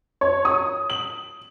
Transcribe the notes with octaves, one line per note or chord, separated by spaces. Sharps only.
C#5
D#6
F#7